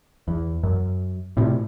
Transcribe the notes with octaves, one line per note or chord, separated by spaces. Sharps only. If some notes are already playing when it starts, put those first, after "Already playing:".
E2
F#2
A2 C3